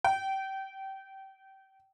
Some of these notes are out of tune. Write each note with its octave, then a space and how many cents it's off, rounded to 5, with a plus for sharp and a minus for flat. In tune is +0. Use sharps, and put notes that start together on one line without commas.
G5 -25